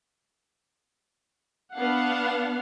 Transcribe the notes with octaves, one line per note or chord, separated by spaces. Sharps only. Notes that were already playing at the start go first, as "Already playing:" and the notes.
B3 D4 F5 F#5